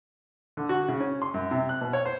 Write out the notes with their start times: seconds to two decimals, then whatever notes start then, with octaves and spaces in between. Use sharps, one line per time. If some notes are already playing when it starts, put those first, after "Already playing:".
0.57 D3
0.69 F#4
0.88 C#3
1.00 C#4
1.22 C6
1.34 F#2
1.51 C3
1.69 F#6
1.81 B2
1.93 C#5
2.06 C5